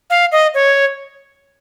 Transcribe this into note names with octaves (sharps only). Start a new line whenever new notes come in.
F5
D#5
C#5